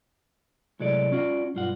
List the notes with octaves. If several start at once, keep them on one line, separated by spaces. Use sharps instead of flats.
A2 C3 F#3 G#3 A4 D5
C#4 F4 F#4 D5
B1 G2 F4 F#5